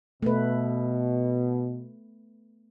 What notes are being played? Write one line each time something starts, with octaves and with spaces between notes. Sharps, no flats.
B2 A3 B3 B4